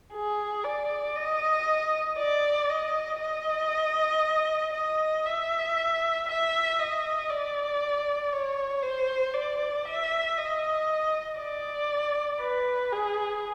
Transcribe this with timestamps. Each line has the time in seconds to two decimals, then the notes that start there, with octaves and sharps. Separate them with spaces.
0.14 G#4
0.65 D5
1.16 D#5
2.18 D5
2.70 D#5
3.20 D#5
4.74 D#5
5.26 E5
6.28 E5
6.79 D#5
7.29 D5
8.33 C#5
8.83 C5
9.34 D5
9.85 E5
10.38 D#5
11.40 D5
12.42 B4
12.93 G#4